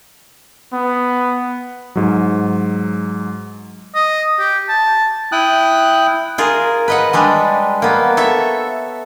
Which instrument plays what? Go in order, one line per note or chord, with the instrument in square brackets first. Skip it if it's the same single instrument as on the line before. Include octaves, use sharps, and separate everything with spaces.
[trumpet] B3
[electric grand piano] G#2 F#3
[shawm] D#5
G4
A5
[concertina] E4 G5 D#6 F#6
[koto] F4 G#4 A#4
B4 D#5 F#5
G3 G#3 D4
A#3 B3
A4 C#5 E5